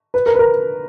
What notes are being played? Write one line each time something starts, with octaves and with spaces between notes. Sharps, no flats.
B4
A#4
B4
A#4